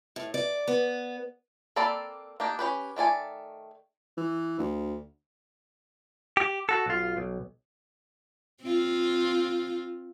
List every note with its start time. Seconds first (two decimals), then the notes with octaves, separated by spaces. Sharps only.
0.16 A2
0.34 D5
0.68 B3
1.76 A#3 C4 A4 D5 B5
2.40 A#3 D4 D#4 G4
2.59 C#4 G4 B4
2.96 D#3 A3 D5 G#5
4.18 E3
4.59 D2
6.37 G4
6.69 F#4 A4
6.86 B1 F4
7.17 B1
8.62 C4 F4